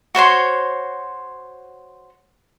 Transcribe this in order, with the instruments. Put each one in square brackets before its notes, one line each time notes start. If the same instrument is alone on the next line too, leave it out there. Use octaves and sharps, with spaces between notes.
[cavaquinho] F#4 C5 C#5 C6